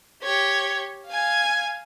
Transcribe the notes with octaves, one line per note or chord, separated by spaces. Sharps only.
G4 C#5
F5 G#5